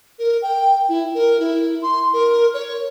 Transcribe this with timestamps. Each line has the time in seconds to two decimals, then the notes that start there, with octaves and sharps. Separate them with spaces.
0.19 A#4
0.42 G5
0.89 E4
1.15 A#4
1.40 E4
1.82 C6
2.13 A#4
2.54 C#5